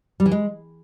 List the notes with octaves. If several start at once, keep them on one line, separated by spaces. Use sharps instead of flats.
G3
E3
G#3